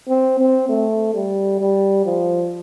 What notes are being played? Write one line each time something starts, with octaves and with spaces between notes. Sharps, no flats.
C4
C4
A3
G3
G3
F3